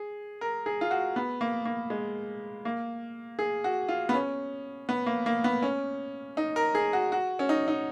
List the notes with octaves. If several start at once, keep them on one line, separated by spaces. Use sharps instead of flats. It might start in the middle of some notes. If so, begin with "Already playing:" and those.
Already playing: G#4
A#4
G#4
F4
F#4
B3
A#3
A#3
G#3
A#3
G#4
F#4
F4
B3
C#4
B3
A#3
A#3
B3
C#4
D#4
A#4
G#4
F#4
F#4
C#4
D#4
D#4